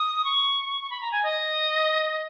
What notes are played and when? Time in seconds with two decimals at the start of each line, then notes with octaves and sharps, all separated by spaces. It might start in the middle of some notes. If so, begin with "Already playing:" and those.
Already playing: D#6
0.24 C#6
0.81 C#6
0.90 B5
1.01 A#5
1.11 G#5
1.23 D#5